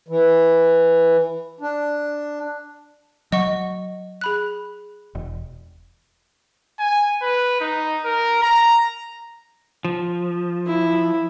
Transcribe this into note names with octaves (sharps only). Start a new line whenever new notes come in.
E3
D4
F#3 D#5 F#5 C#6
G#4 B5 F#6
E1
G#5
B4
D#4
A#4
A#5
F3
E4